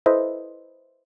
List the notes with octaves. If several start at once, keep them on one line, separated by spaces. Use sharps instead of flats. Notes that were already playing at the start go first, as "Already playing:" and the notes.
E4 A4 B4 C5 D#5 E5